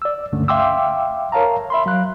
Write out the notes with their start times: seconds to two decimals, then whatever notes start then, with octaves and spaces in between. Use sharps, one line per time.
0.02 D5 E6
0.32 C#2 G2 D3 A3 C#4
0.48 E5 F5 G5 C6 D6 E6
1.32 A#4 C#5 F5 A5 A#5
1.70 E5 B5 C6
1.86 F#3 F5 F#6